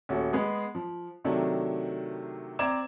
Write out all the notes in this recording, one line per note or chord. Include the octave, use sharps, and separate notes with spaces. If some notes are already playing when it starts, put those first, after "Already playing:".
D#1 A3 C#4 F#4
G#3 B3 G#4
F3
C3 D#3 F#3 A3 D4
C4 D5 A#5 D6 G#6 E7